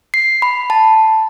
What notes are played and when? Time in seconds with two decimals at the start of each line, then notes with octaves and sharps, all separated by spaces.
0.14 C7
0.42 B5
0.70 A5